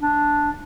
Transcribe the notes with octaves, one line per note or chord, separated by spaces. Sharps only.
D4